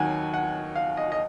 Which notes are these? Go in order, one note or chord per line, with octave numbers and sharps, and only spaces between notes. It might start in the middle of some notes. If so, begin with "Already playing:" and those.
Already playing: D#2 D#3 F#3 F#5 G#5
F#5
F5
D#5
D#5